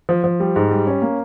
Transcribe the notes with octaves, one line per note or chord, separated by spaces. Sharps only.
F3
F3
G3
G#2
G3
C#4
A#3